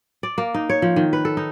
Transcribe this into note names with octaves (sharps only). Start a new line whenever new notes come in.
D5
A#3
D#4
C#5
F3
D#3
B4
A4
D#4